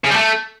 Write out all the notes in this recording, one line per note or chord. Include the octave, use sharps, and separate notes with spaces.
C#3
G3
A3